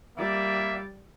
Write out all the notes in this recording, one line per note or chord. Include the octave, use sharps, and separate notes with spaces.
G3 A#3 D5 E5